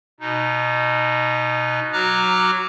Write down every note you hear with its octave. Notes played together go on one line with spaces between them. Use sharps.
B2 D#4
F#3 F#4 A#5 D6 F6 F#6